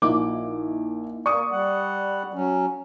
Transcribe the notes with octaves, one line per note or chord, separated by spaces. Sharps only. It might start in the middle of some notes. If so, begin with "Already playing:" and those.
A#1 A#3 D#4 E4 D6
A#3 D5 C#6 D#6
G3 F#5
F#3 C#4